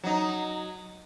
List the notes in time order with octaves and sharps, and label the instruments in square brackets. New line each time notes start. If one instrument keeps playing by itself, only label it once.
[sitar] F#3 D#4